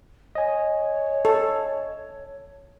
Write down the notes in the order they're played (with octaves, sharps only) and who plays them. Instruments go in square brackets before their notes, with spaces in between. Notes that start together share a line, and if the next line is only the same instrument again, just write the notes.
[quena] C#5 [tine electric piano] D#5 G#5
[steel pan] A4